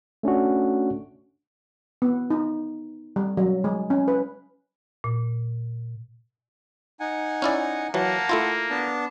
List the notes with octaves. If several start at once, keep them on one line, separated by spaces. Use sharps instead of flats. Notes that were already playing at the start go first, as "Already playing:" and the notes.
A3 C#4 D4 F#4
B3
D#4
G3
F#3
G#3
C#4
B4
A#2
D#4 F#5 G#5
C#4 E4 D5
E3 F#3 A#3 F#5 A5
A3 E4 F4
B3 D4 A5